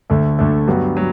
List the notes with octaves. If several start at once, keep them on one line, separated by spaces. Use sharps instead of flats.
D2 D3 A3
D2 D3 A3
G2 F#3 B3 F#4
F#3